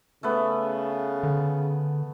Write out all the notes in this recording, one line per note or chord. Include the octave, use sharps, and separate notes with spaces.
C#3 A3 B3
D3